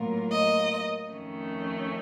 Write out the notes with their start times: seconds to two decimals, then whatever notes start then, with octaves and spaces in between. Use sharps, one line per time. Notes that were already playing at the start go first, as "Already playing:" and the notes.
Already playing: A2 F#3 A#3 F4 A#4
0.32 D#5
1.11 F2 D#3 A3 C#4